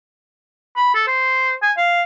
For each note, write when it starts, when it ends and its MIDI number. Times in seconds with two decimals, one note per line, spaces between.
0.76 0.92 83
0.95 1.03 69
1.07 1.55 72
1.62 1.72 80
1.77 2.02 77